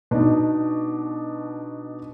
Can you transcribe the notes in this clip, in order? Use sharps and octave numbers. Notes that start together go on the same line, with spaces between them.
B2 D4 D#4